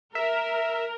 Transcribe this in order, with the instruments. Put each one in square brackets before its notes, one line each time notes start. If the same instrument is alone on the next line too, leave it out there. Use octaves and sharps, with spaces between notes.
[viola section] A#4 [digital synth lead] E5